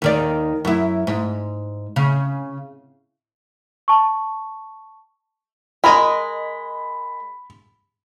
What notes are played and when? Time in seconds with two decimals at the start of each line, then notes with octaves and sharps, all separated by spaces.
0.02 D#2 D#3 D5
0.65 F#2 E4
1.07 G#2
1.96 C#3
3.88 A5 C#6
5.84 G#3 A#4 D#5 B5